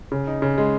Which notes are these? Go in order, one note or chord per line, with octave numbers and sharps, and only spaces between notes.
C#3
D#4
C#3
G#3